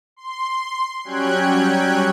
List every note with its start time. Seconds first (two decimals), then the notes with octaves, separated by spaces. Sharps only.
0.16 C6
1.04 F#3 G3 C#4 G5 F#6 G#6